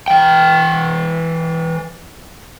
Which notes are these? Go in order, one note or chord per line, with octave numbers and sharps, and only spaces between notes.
E3 G5